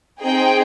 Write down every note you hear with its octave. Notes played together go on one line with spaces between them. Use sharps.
C4 D#4 G#4 G5